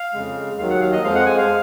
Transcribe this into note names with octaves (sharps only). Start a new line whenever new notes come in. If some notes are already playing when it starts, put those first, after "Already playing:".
Already playing: F5
F2 C#3 G#3
D#2 D#3 F#3 F5
F#5
F5
D#5
F2 F3 G#3 F5
F#5
G#5
F5